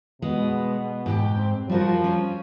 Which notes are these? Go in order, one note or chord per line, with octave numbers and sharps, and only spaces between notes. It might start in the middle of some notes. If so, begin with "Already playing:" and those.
B2 G#3 B3
G#2 G4 G5
C4
F3 G3 F#4 A#4
C#4